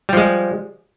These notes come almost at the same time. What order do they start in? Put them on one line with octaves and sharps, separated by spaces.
G3 F3 G#3